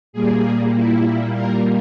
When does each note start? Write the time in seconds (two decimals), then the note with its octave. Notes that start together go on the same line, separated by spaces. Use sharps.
0.13 A#2 G3 A#3 G#4
0.74 E4
1.34 A#4